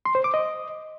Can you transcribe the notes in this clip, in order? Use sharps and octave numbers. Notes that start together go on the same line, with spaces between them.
C6
C5
D6
D#5